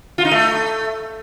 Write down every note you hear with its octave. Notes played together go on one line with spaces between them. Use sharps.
F4
D#4
A3